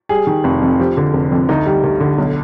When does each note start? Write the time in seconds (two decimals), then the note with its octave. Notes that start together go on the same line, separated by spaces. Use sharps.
0.09 G3 G#4
0.27 D#3
0.44 F1
0.62 F2
0.79 F3 G4
0.97 D3
1.14 F1
1.32 F2
1.49 D2 D#4
1.66 G3
1.84 D2
2.00 D3
2.18 B1